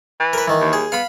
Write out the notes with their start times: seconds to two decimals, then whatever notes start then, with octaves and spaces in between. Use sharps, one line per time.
0.20 E3
0.33 A#4 B4
0.48 D#3 E3
0.61 D#2
0.73 G#4
0.92 B3 F5 B5